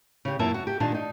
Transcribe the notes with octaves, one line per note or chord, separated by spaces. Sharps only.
C#3 G4
F#2 A#2 A#3 E4 E5 A5
F#4
G4
A#2 D#3 A#3 D4 A5
D#4